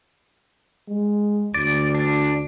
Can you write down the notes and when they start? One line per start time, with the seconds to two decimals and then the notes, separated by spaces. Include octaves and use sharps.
0.88 G#3
1.54 D2 D5
1.95 D4